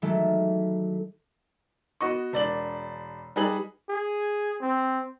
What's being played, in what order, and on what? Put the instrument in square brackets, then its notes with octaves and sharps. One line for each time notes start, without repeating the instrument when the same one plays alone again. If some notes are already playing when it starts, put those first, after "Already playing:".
[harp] D#3 E3 F#3 G#3 A3
[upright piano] B3 F#4 D#5 C#6
E1 D5 F#7
G3 D#4 G#4 B4 F#7
[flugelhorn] G#4
C4